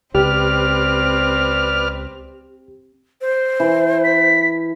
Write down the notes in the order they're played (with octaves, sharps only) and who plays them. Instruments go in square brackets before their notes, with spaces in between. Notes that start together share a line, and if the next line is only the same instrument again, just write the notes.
[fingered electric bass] C#2 [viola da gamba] C4 [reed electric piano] G4 [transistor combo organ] B4 D5 F6
[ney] C5
[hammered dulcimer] E3
[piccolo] B6